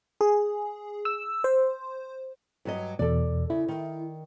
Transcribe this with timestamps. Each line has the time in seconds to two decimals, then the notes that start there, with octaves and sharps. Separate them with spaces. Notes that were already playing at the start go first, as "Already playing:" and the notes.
0.21 G#4
1.05 E6
1.44 C5
2.65 G2 F#3 D#5
2.99 E2 B2 A4 D5
3.50 C#3 E4
3.68 D#3